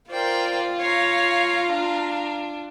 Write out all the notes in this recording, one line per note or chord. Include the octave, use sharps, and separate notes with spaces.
F4 A#4 C5 D5 G5
C#5 F5 A#5
D4 F5 A#5